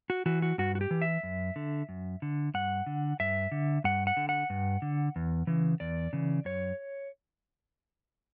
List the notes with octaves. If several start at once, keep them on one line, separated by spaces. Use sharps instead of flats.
F#4
E3 F#4
F#4
G2 F#4
F#4
G4
E3
E5
F#2
D3
F#2
D3
G2 F#5
D3
G2 E5
D3
G2 F#5
F#5
D3
F#5
G2
D3
E2
C#3 E3
E2 D5
C#3 E3
F#2 C#5